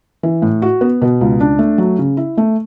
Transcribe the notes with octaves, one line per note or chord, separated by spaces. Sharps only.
E3
A2
F#4
B3
B2
C#2
D4
A3
F#3
C#3
E4
A3